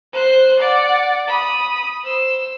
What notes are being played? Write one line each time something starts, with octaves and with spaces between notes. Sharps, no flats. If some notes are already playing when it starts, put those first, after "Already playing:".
C5 F#6
D5 F#5
B5 D#6
C5 E6